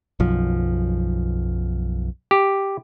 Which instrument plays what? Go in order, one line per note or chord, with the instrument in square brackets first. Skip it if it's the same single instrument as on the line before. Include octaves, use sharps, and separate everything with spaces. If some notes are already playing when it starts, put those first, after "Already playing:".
[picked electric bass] B1 F#2 F3
[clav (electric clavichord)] G4